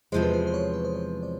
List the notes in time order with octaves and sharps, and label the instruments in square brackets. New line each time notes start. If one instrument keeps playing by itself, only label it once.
[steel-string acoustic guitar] E2 C3 F3 G#3 [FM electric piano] C5
[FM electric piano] B4
C5
C5
C#5
B4
C5
C#5
D5